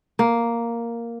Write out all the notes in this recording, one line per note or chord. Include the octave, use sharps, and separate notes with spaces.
A#3